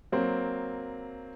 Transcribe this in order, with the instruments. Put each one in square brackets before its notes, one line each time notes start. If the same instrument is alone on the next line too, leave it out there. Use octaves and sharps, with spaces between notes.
[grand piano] F#3 A#3 C4